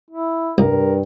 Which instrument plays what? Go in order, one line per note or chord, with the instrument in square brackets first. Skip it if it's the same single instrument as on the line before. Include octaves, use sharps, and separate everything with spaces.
[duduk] E4
[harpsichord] C2 [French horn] G2 [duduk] A#4